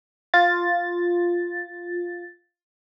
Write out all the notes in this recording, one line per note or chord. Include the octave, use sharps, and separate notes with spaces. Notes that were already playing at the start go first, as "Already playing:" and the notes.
F4 A6